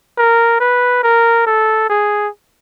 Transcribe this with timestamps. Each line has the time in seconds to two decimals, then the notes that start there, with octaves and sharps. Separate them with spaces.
0.18 A#4
0.60 B4
1.03 A#4
1.46 A4
1.90 G#4